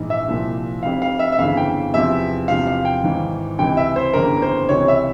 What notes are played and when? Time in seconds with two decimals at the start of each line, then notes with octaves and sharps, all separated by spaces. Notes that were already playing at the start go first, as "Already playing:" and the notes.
Already playing: A#1 G#2 E3
0.10 E5
0.28 C2 A#2 F3
0.83 F1 F2 C3 F5
1.02 F5
1.19 E5
1.32 E5
1.38 G1 F2 C#3 E3 F5
1.57 G5
1.94 E2 C3 F3 E5
2.48 E2 C3 F3 F5
2.67 F5
2.85 G5
3.03 G#1 G#2 E3
3.59 C#2 C3 E3 G5
3.77 E5
3.96 C5
4.14 G1 F2 C#3 E3 A#4
4.42 C5
4.69 C#2 C3 E3 C#5
4.88 E5